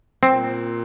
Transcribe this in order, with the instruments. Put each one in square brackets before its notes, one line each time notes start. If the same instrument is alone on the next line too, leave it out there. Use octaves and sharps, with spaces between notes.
[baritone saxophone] A#2 [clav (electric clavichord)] C4